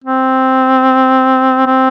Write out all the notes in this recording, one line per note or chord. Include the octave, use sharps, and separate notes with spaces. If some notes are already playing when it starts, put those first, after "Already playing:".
C4
C4